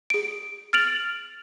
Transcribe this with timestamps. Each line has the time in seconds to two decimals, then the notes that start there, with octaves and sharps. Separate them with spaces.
0.10 G#4 D7
0.73 F6 A6 D7 F7 F#7